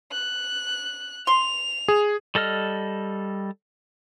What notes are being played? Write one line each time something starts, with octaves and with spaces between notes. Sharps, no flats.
F#6
C6 F7
G#4
G3 A4 D#5 F6